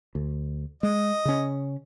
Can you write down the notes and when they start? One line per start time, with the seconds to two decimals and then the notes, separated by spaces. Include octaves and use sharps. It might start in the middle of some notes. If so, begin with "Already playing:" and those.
0.15 D2
0.83 G#3 D#5
1.25 C#3 C#4